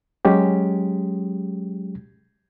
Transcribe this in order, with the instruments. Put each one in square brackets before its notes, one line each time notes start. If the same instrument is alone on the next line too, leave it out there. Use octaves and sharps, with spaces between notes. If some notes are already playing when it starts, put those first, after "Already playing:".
[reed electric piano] F#3 G#3 C#4 G4